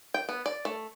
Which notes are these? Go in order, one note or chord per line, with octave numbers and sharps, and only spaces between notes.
G5
B3
D5
A3